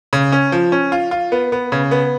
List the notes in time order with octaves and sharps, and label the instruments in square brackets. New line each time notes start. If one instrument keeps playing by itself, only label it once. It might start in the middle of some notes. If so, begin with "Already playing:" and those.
[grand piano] C#3
C#4
F3
C#4
F4
F4
B3
B3
C#3
B3